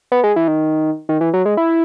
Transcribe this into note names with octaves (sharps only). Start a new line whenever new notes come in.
B3
G#3
E3
D#3
D#3
E3
F#3
G#3
E4